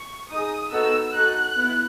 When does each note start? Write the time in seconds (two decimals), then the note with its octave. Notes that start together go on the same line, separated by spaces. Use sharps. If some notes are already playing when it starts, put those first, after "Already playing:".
Already playing: C#6
0.30 D#4 G#4 D#6
0.72 B3 D#4 F#4 A4 E6
1.13 D#4 F#4 A4 F#6
1.56 B3 E4